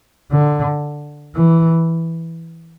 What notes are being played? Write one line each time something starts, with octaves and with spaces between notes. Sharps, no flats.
D3
E3